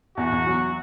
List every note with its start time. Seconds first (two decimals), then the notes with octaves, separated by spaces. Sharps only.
0.17 E2 F#4
0.32 E2
0.47 F#3